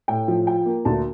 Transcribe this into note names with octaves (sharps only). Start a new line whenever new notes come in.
A2 G5
F3
F4 G5
A#3
D2 A5